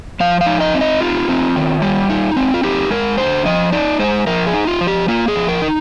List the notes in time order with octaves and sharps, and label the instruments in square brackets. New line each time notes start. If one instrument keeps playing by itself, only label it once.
[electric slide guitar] F3 F5
F5
D#4
D#5
C4
D#5
D#4 F4
C4
D#3
G3
D#4
C4
F4
D#4 G4
G#3 A#4
D3 C5
F3 D#5
D#4 D5
G#3 C5
F3 A#4
G#4
D#4
F4
F3
G4
A#3 F4
G#4
F3
A#4
D#4